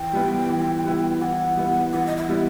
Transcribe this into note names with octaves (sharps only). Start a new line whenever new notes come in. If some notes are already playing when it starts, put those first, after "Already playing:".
Already playing: E3 G5
G3 B3 E4
E3
G3 B3 E4
E3 F#5
G3 B3 E4
E3 F#5
D#5
E5
G3 B3 E4